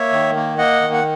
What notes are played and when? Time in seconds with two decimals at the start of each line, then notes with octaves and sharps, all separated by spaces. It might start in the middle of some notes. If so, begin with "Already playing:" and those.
Already playing: A#3 C#5 E5
0.13 D#3
0.36 A#3
0.58 A#3 D#5 F#5
0.81 D#3
0.93 F#5